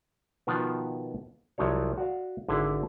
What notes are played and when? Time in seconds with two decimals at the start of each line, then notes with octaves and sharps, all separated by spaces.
0.47 B2 D#3 F3 B3 F4
1.58 C2 F3 F#3 C#5
1.98 F#4 D5 F5
2.48 G#1 D3 E4 E5 F5